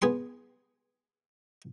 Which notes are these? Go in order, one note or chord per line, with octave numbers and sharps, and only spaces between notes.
B3 G#4 G#5 C6